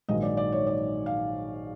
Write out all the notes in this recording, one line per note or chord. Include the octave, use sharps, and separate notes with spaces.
A#1 G#2 D#3 F#3 D#5
D5
D5
C#5
D5
F5